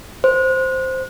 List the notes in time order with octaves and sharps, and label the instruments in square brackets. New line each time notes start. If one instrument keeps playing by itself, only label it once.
[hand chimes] C5